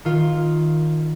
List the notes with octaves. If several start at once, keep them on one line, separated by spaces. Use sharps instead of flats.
D#3 F4